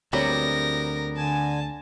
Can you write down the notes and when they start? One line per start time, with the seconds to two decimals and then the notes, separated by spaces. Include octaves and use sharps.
0.13 D2 F#3 G3 B3 C4 A#4 A#6
1.17 D3 G#5 A5